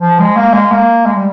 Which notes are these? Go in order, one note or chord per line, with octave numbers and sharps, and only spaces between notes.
F3
G#3
A#3
G#3
A#3
G#3
G3